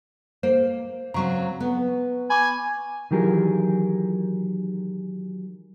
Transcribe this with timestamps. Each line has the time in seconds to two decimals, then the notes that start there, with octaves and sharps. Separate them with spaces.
0.43 A#3 C5
1.14 C#3 F#3 C4 A#5 C#6
1.60 B3
2.30 G#5 B5 C#6 D6
3.11 D#3 E3 F#3 G4 G#4 A#4